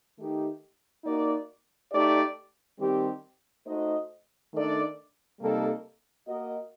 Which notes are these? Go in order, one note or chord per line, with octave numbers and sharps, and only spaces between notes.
D#3 A3 D#4 G4
A#3 D#4 F#4 A#4 D5
A3 D#4 G4 D5
D#3 G3 C4 G4
A3 D#4 F#4 C5 D#5
D#3 A3 D4 A4 D5
C3 G3 A#3 D#4 A4
A#3 F#4 A#4 D#5